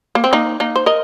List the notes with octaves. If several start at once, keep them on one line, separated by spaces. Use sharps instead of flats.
A#3
C4
A#3 D#4
A#3 D#4
C5
A#4 D#5